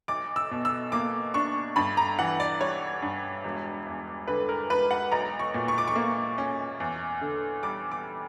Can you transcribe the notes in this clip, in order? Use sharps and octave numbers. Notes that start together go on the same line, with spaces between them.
B1 D6
E6
B2
E6
A#3 D6
D4 C#6
G2 B5
A#5
E3 F#5
D5
G3 C#5
G2
E1
E2
D3 B4
A#4
E1 B4
F#5
B1 A#5
C#6
A#2
C#6
D6
C#6
A#3
C#4
E2
D3
G3 D6
D6